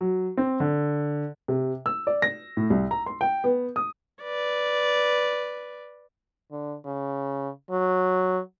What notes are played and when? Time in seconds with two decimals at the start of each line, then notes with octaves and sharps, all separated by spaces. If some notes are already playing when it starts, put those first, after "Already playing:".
0.01 F#3
0.37 C4
0.60 D3
1.48 C3
1.86 E6
2.07 D5
2.22 A#6
2.57 A2
2.70 C2
2.91 A#5
3.06 C6
3.21 G5
3.44 B3
3.76 D#6
4.23 B4 D5
6.51 D3
6.86 C#3
7.71 F#3